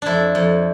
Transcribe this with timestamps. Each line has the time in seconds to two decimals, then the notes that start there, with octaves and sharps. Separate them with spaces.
0.02 F2 D4 E4
0.35 F2